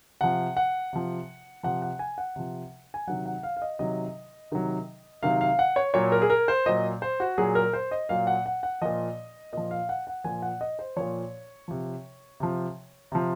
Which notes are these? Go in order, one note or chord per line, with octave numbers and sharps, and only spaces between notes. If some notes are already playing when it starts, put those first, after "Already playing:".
C3 F3 F#5
F#5
C3 F3
C3 F3 F#5
F#5
G#5
F#5
C3 F3
G#5
C3 D#3 F#3 F#5
F#5
F5
F5
D#5
C3 D#3 F#3 D#5
C3 D#3 F#3
C3 D#3 F#3 F5
F5
F#5
C#5
A#2 F#3 C#5
A#4
G#4
A#4
C5
A#2 F#3 D#5
C5
F#4
A#2 F#3 G#4
A#4
C5
D#5
A#2 F#3 F5
F#5
F#5
F#5
A#2 F3 D#5
A#2 F3 D#5
F5
F#5
F#5
A#2 F3 G#5
F#5
D#5
C5
A#2 F3 C#5
C3 F3
C3 F3
C3 F3